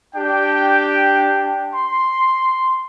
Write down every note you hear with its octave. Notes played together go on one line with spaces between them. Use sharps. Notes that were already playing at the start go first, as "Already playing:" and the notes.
D4 G4 G5
C6